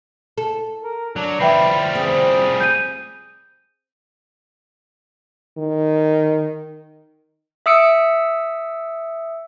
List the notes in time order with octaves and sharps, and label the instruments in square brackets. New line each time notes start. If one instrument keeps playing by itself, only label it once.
[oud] A4
[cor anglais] A#4
[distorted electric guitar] F#3 [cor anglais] D4
[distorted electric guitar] F3 G3 [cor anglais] B4 [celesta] E5 G5 C7
[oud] C4 [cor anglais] G#4
[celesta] G6 D#7
[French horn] D#3
[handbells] E5 D#6 E6 C#7 D7